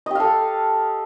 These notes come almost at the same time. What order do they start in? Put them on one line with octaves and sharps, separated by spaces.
D#5 G4 F5 A4